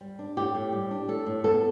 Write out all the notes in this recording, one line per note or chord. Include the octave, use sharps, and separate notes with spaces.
G3
D4
A2 G4
A2
G3
D4
A2 A4
A2
B3 A4